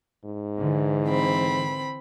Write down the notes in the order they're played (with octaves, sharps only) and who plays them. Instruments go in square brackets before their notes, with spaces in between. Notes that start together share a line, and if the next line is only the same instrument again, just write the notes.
[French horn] G#2
[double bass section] D3 E3
[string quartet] C4 B5